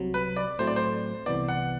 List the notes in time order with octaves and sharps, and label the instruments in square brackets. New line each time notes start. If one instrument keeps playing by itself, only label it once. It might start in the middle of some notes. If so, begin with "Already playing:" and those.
Already playing: [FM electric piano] C2 C3 F#3
[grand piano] B4
D5
[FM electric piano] A2 F#3 A3 C4 [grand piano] C5
[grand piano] D5
C5
[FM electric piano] C2 C3 E3 B3 [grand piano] D5
[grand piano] F#5